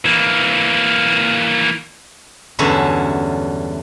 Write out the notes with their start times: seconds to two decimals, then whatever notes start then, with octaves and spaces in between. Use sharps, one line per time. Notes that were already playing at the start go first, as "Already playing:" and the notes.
0.06 E3 A#3
2.59 E2 G2 D3 F#3 C#4 E4